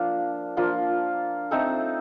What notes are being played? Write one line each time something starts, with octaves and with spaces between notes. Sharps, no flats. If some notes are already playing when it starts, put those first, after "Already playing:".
Already playing: F3 A#3 D4 F4
F3 A#3 D4 F4
A3 C4 D#4 A4